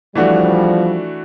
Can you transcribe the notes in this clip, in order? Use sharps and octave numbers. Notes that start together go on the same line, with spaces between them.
E3 F3 G3 A3 D4 F#4